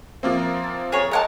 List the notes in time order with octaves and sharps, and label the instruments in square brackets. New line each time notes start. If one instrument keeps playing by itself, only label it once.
[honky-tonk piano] F3 A#3 C4 [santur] E5
[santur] A#4
A5
[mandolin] G#4 C#5 [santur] A#4
[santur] G#3 C#5 D6 [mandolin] A#4 F#5 A5